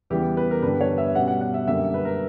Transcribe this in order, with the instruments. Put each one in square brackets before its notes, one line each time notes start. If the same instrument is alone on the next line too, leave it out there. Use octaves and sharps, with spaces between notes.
[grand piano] E2 C#3 E3 G3 B3 G4
B4
A#4
G2 D3 G3 B3 D4 B4
C#5
E5
B2 G3 C#4 F#5
F#5
F#5
E5
F#2 D3 G3 A#3 E5
B4
A#4